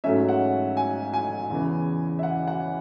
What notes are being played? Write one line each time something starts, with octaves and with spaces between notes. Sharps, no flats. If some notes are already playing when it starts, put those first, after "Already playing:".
G#2 F#3 A3 C#4 E5
F#5
G#5
G#5
E2 C#3 E3
E5
F#5
F#5